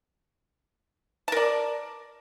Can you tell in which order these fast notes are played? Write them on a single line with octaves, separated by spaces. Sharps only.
A5 A#4 D5